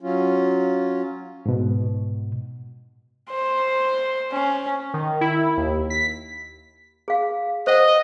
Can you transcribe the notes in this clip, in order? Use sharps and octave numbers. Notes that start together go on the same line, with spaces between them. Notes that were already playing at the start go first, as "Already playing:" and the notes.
F#3 C#4 F4
G#2 B2
C5
C#4
D#3
E4
D#2
B6
G#4 F5
C5 D#5 F#5